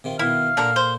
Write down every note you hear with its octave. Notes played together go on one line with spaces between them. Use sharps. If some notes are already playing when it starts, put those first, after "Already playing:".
C3 D#3 F4
B2 D#3 E4 F5
A#2 D3 D4 A4 A#4
C5